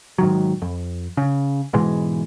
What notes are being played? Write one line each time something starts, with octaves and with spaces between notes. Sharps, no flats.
G#2 D#3 F#3
F2
C#3
G#2 B2 E3 G#3